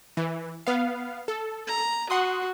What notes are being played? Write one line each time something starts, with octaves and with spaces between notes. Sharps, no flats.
E3
B3 F5
A4
A#5
F#4 F#5 C6 D#6